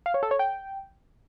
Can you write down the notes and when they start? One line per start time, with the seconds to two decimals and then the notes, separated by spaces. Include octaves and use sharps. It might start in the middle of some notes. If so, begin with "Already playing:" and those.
0.06 F5
0.14 C#5
0.23 A4
0.31 C#5
0.39 G5